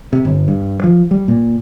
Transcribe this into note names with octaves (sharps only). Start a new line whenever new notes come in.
C3
G1
G2
F3
G3
A#2